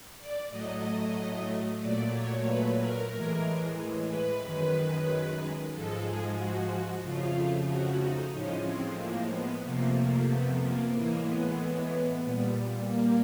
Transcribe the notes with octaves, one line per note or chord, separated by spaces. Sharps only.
D5
A2 F#3 A3 D#5
A#2 F#3 A3 D5
C#5
B4
A#4
A2 E3 G#3
B4
F#2 D#3 G#3 B4
G#2 F3 G#3 A4
G#4
F#4
F2 C#3 F3 A3 F4
F#4
D#4
A2 F3 G#3 C#4
C4
A#3
B3
F2 C3 F3 A3 A#3
A#3
B3
A#3
A2 E3 G#3 A#3
B3
A#2 G3
A#3